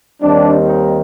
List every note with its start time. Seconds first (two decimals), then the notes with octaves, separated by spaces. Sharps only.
0.21 D#2 D#3 G3 C4 D4
0.67 D#4